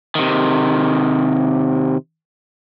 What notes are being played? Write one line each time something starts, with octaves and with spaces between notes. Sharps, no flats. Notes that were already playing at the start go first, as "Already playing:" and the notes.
C3 D#3